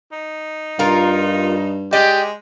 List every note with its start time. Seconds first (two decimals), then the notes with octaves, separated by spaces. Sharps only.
0.12 D#4
0.79 G2 F4 A#4
1.93 G#3 G4 D5 D#5